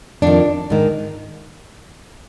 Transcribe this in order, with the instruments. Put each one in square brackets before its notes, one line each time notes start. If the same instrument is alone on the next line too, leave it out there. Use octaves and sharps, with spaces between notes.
[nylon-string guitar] F2 D#3 D4
G#2 D#3